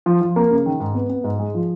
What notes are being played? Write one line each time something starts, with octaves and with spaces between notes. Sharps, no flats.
F3
F3
A#3
C#3
D#3
G#2
B3
B3
G#2
G#3
F3